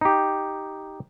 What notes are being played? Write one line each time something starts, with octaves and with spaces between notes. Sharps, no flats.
D#4 G4